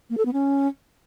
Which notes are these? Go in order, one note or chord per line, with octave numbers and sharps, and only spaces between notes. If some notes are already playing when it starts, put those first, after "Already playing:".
A#3
A4
B3
C#4